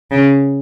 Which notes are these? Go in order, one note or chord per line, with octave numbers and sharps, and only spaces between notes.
C#3